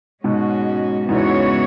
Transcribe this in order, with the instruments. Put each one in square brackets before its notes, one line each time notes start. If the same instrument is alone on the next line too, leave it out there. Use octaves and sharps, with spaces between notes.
[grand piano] G#2 B2 [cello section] G#3 C#4 F#4
[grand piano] E2 G#2 [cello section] C#3 E3 B3 F#4 C#5